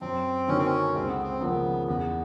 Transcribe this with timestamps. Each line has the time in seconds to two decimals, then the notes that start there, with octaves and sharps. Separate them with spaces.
0.01 F#2 C4
0.48 D3 F#3 A#3 C#4 D#4
0.58 C4
0.66 C#4
0.95 C#2 C4
1.08 B3
1.23 C4
1.40 C#3 F3 A#3 B3
1.87 E2 B3